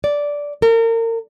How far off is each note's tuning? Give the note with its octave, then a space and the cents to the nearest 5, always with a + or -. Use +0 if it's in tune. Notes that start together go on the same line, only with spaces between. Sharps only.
D5 -10
A#4 -35